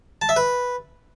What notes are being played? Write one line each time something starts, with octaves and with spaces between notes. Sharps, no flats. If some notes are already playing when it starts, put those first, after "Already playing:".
A5
E5
B4